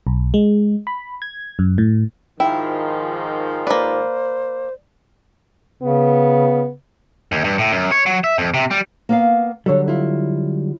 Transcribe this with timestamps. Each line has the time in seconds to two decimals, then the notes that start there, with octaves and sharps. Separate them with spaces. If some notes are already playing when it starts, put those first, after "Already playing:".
0.07 B1
0.34 G#3
0.87 B5
1.22 G#6
1.59 F#2
1.78 A2
2.40 G#2 D#3 F3 E4 G5
3.67 A#3 B4 C5 D5
5.82 C#3 B3
7.32 D#2
7.44 G2
7.58 A2
7.72 F#2
7.92 C#5
8.06 F#3
8.24 E5
8.38 F2
8.54 C3
8.71 G3
9.09 A#3 B3 F5
9.66 D3 F#3 G3 A4 C#5
9.88 E4 F4